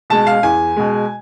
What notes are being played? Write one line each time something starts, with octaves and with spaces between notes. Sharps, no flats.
B2 G#3 A5
F5
E2 G#5
B2 G#3